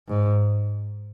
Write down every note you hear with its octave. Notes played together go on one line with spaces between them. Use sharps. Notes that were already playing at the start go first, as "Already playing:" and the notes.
G#2